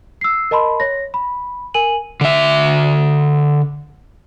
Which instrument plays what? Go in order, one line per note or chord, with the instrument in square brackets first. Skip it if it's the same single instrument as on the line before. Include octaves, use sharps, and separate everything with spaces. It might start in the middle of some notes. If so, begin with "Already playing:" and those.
[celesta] E6 C7
A#4 D#5 A5 B5 C6
C#5 A#6
B5
A#4 G#5 D#7 F#7
[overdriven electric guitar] D3 E5